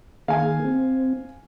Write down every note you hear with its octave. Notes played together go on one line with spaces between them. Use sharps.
D#3 A#3 G#4 F5 G#5
C4